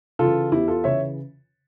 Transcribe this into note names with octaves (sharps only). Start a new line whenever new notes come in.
C#3 E3 F4 A4
E2 E4 G4
F4 A4
C#3 E3 C#5 E5